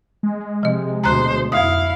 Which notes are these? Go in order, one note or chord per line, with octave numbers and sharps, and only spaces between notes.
G#3
C3 F3 D#5
D2 B2 C5 A#5 F#6
F2 E4 F5 D#6